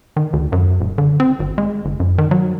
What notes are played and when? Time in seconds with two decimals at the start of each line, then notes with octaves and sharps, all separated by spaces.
0.16 D#3
0.33 D2
0.52 F#2
0.80 D#1
0.98 D3
1.20 C4
1.39 G#1
1.58 G#3
1.85 G1
2.00 F#2
2.18 D#3
2.31 F#3